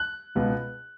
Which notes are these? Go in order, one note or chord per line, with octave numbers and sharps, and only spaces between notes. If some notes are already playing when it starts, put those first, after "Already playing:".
Already playing: F#6
C#2 B2 B3